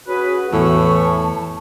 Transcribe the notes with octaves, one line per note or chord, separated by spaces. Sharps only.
C#4 F#4 G#4 B4
E2 A2 E3 A5 C#6